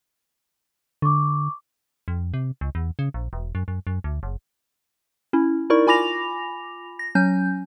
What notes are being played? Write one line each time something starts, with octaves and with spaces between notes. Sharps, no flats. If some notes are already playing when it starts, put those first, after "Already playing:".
D3 C#6 D6
F2
C3
C#2
E2
C#3
A#1
E1
F#2
F#2
F#2
D2
F#1
C#4 E4
D#4 E4 A#4 D5 C#6
F4 G#5 B5 D6 A#6 F7
A#6
F#3 C#4 G#5 G6